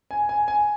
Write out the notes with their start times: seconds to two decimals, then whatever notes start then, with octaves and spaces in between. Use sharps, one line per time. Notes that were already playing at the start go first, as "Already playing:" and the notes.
0.11 G#5
0.29 G#5
0.48 G#5